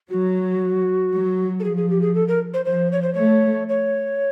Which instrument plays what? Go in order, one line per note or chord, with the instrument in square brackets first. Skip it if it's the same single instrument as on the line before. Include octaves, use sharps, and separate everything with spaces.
[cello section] F#3 [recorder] F#4
[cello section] F#3
[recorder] A4
[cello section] F3 [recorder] G#4
[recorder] G#4
G4
G#4
A4
A#4
C5
[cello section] F3 [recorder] C5
[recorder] C#5
C5
[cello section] A3 [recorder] C#5
[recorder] C#5